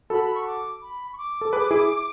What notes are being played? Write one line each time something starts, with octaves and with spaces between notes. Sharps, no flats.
F#4 A4 B5
B5
C#6
D6
B5
C#6
D6
A4
G#4 B4
E4 G#4